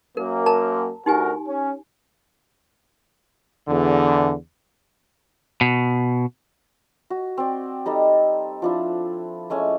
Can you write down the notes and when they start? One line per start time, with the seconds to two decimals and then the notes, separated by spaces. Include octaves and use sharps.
0.17 F#2 A#3 A#4
0.46 A#4 A5 A#5
1.06 D2 D#4 F#4 G4 A#4 G#5
1.47 C#4
3.68 E2 D3
5.61 B2
7.10 F#4
7.37 C4 D5
7.86 G3 D#4 A4
8.62 F3 D4 E4
9.50 G#3 A3 C#4 G#5